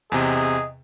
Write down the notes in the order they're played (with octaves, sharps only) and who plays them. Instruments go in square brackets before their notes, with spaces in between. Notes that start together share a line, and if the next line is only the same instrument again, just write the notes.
[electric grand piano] E2 C3 [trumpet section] G#4 D#5